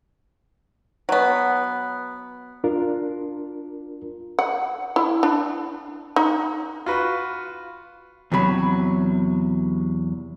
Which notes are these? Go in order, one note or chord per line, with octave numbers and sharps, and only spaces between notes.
F#3 B3
D4 F4 A#4
F#5
E4
D4
D#4
F4 F#4 B4
E2 C3 F#3 B5